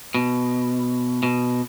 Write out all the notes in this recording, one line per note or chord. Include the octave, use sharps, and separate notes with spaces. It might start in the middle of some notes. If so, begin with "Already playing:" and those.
B2
B2